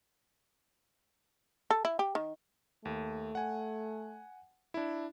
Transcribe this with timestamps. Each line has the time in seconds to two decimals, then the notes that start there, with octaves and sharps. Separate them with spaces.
1.70 A4
1.85 E4
1.99 G4
2.15 D#3
2.85 D#2 A3
3.35 F#5 G#5
4.74 D4 E4